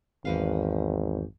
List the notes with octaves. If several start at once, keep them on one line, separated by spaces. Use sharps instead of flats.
G#1 E2 B4 F5